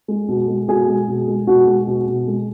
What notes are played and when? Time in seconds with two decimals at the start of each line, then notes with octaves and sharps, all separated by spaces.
0.08 G#3
0.28 B2
0.48 G#3
0.68 B2 G#4
0.88 G#3
1.08 B2
1.28 G#3
1.47 B2 F#4
1.67 G#3
1.87 B2
2.07 B2
2.27 G#3